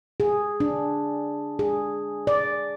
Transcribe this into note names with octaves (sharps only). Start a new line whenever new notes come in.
G#4
D4
G#4
D5